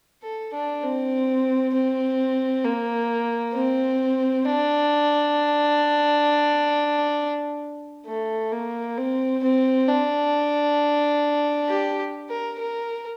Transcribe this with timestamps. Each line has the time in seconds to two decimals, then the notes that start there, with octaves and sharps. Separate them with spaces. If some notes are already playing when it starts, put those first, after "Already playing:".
0.22 A4
0.53 D4
0.83 C4
1.74 C4
2.64 A#3
3.54 C4
4.45 D4
8.06 A3
8.52 A#3
8.98 C4
9.43 C4
9.87 D4
11.69 G4
12.29 A#4
12.59 A#4